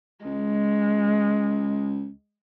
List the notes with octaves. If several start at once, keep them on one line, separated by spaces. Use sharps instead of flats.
C#2 G#3